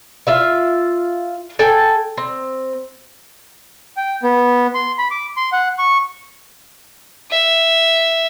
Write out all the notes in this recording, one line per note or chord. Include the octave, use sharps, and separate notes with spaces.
F4 E5 F5
A4 G5 G#5
C4
G5
B3
C6
B5
D6
C6
F#5
C#6
E5